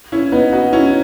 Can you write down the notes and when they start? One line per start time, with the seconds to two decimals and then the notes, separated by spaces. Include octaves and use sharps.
0.12 C#4 E4
0.32 B3 D#4
0.52 D#4 F#4
0.73 C#4 E4